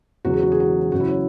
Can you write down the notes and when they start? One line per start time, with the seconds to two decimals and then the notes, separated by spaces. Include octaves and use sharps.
0.25 E1 E2 C#3 F#3 F#4
0.33 G#4
0.42 F#4
0.52 G#4
0.60 F#4
0.92 F#1 F#2 C#3 F#4
1.00 E4
1.09 C#5